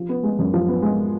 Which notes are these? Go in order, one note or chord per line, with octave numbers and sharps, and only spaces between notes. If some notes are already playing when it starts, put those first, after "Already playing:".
Already playing: F3
B3
G#3
F#2
F3
B3
G#3